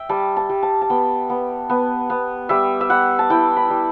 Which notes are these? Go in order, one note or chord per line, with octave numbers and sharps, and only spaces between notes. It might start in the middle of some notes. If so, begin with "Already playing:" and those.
Already playing: E5 G5
G3 A5
A5
G3
A5
A5
B3 G5
B3
B3
B3
G3 E5
E5
G3 F#5
A5
E4 G5
B5
G3